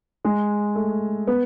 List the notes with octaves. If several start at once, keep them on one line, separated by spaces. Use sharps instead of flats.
G#3
A3
B3